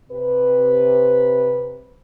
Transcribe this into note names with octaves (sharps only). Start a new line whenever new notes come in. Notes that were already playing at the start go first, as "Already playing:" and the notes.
C3 B4